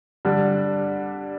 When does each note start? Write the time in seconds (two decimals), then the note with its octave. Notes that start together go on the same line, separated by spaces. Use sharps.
0.25 D3 G3 D4